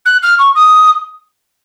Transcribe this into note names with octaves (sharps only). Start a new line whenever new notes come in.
F#6
F6
C#6
D#6